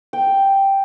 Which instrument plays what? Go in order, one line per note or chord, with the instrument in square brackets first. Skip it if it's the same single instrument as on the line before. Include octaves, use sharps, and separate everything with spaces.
[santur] G5